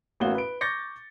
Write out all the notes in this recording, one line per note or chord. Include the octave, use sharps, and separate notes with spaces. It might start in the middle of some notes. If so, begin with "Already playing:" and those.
A1 A#3 C#4 F#4 F5 G7
B4 D7
C#6 D6 G6 A6 A#6 C#7